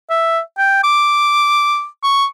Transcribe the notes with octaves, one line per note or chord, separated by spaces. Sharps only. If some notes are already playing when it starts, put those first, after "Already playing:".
E5
G5
D6
C#6